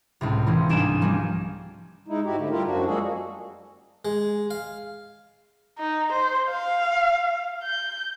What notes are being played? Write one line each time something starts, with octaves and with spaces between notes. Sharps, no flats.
C#2 A2 C3
E3 A#3 C4 C#4
C2 G#2 D4 G#5 D7 E7
F3 G3 A#3 C#4 D4
G#3 D#4 E4
G#2 E4 F#4 G4
G#2 D3 A3
G3 E4 F4 G4 A#4
F#2 F3 D4 F#4
G3 G#3 A#3 F#4 G#4 A4
G#3
F5
D#4
C5
F5
G6